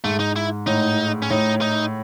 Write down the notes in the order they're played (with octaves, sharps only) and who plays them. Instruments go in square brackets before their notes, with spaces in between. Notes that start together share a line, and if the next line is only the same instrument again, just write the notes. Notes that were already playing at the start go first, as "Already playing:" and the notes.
[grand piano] G#2 [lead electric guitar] A3
[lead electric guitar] D#4
E4
[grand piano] A2 [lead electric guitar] D#4
[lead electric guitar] C#4
[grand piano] A2 [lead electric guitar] D#4
[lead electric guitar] D#4